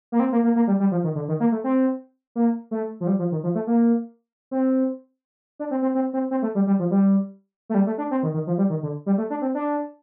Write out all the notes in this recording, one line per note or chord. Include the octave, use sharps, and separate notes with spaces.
A#3
C4
A#3
A#3
A#3
G3
G3
F3
D#3
D3
D#3
A#3
A3
C4
A#3
A3
F3
G3
F3
D#3
F3
A3
A#3
C4
D4
C4
C4
C4
C4
C4
A3
G3
G3
F3
G3
A3
G3
A3
D4
C4
D#3
D#3
F3
G3
D#3
D3
G3
A3
D4
C4
D4